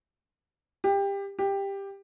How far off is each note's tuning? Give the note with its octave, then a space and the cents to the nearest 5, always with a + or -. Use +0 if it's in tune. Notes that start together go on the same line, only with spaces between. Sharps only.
G4 +20
G4 +10